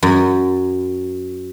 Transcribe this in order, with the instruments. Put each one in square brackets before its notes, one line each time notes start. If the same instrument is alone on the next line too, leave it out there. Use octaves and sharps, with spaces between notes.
[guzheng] F#2